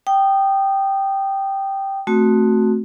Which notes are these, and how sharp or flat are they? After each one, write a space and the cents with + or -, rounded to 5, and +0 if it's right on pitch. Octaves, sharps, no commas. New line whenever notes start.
G5 -5 D#6 -20
A3 +0 C4 +0 F#4 +0